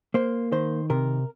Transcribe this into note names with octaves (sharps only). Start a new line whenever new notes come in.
A#3 C5
D#3 C5
C3 A#4